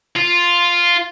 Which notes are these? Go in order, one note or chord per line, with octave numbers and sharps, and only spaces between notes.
F4